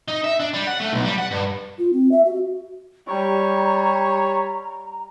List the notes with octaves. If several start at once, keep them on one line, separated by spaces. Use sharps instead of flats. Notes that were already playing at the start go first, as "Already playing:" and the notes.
D#4
E5
D4
G3
F#5
A3
B1
G3
F#5
G2
F4
C4
E5
F#4
G3 C#5 A#5